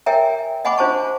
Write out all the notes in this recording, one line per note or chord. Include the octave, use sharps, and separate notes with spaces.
A#4 C#5 E5 G5 G#5 A#5
D#5 F#5 G#5 B5 C6 D6
D4 F4 C5 G#5 A5 C#6